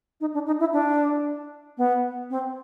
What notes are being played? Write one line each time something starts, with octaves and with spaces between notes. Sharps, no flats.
D#4
D4
D#4
E4
D4
B3
C4